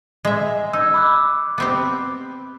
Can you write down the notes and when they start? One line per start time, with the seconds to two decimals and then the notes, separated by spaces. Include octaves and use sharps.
0.25 G#3 E5
0.73 D#4 E6 G#6
0.94 B5 D6 F#6
1.58 B3 C4 G4